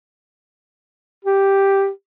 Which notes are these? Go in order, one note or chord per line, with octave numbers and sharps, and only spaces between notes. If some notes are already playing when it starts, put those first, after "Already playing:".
G4